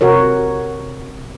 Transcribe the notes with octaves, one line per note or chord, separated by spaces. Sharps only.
C3 F#4 A#4 C#5